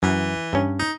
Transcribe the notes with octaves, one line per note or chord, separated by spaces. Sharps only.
F#2 E3
G2 C#4
D#4